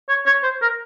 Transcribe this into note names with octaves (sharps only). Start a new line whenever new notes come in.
C#5
C#5
C5
A#4